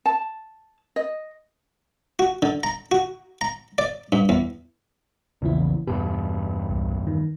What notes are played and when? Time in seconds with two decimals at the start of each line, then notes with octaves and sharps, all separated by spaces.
0.06 A5
0.96 D#5
2.19 F#4
2.42 D3
2.63 A#5
2.91 F#4
3.41 A#5
3.78 D5
4.12 G2
4.29 E2
5.42 A#1 E2 C#3 E3 E4
5.87 E2 G2 B2 G4
6.70 C2
7.07 D#3